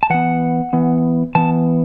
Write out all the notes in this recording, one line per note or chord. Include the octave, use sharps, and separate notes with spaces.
A5
E3 B3 F#5
E3 B3
E3 B3 A5